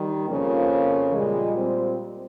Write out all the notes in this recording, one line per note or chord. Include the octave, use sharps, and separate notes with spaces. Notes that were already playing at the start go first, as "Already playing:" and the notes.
Already playing: D#3 G3
F2 C#3 F3 A#3
A#2 G3 G#3
C4